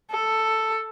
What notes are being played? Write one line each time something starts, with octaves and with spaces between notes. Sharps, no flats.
A4